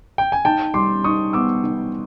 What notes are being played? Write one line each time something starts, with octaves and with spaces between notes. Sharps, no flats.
G5
G#5
D#4 G5 A5
G3 C6 D6
D#4 C#6 D#6
B3 D6 E6
D#4